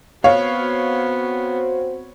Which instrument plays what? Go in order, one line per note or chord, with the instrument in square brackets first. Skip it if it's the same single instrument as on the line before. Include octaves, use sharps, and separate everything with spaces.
[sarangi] B3 [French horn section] C4 F#4 C5 [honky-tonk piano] C#5 [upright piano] F5